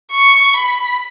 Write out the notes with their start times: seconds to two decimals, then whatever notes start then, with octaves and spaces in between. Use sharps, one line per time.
0.12 C#6
0.56 B5